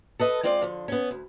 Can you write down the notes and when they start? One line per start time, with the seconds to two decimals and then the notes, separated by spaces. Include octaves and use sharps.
0.19 A4 B4 D#5
0.43 G#3 C4 F4 D5 F5
0.62 D3 F3
0.88 B3 C#4
1.11 D2